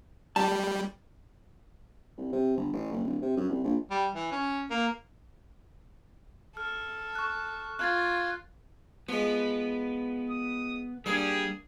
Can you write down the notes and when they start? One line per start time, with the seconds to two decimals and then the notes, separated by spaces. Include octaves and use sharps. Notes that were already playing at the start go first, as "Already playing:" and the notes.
0.36 G3 A5
2.17 C2
2.32 C3
2.57 G1
2.73 A1
2.92 F#1
3.04 D1
3.22 C3
3.37 F#2
3.49 C2
3.64 A#1
3.91 G3
4.15 E3
4.31 C#4
4.70 A#3
6.57 A4 F6
7.15 C#6 F#6
7.79 F4 F#6 G#6 A6
9.09 F3 G#3 B3
10.30 D#6
11.06 G3 A#3 D4 G#4 A#4